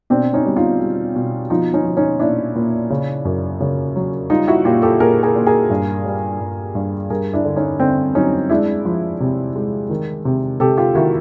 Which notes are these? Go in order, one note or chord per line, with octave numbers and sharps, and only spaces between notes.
B2 C4 D4
C#4 D#4
G3
D#4 F4
G3
B2
F3 D#4 F4
C#4 D#4
F3
C#4 D#4
A#2 D4 E4
A#2
C#3
F#2
C#3
F#3
G3 D#4 F4
E4 F#4
A#2 F4 G4
G4 A4
A#2 G#4 A#4
G#4 A#4
A#2
G#4 A#4
G2
G3
G2
G2
G2 G#4 A#4
D4 E4
D3
C#4 D#4
D3 C4 D4
F#3 C#4 D#4
G#3 D4 E4
F3
C3
G#3
D#3
C3
C3 G4 A4
F4 G4
D#3 E4 F#4